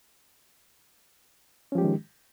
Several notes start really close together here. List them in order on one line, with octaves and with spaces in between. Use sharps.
C#4 F3 G4 G#3 D#3